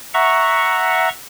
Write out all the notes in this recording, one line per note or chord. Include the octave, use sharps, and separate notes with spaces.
E5 F#5 A#5 C#6